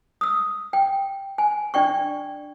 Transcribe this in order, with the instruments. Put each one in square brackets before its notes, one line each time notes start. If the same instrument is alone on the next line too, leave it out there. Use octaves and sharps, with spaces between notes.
[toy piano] D#6 E6
G5
G#5
D4 D5 G5 C#6